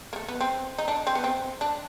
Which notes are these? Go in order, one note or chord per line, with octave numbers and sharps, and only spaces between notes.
A#3
A3
B3
C4
D#4
D4
C4
B3
C4
D4